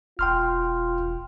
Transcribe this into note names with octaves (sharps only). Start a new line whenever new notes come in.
E1 F4 G5 C6 F6